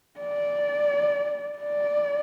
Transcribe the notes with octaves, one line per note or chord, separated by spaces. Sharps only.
D5
D5